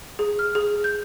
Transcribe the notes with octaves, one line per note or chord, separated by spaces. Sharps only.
G#4
F6
G#4
G6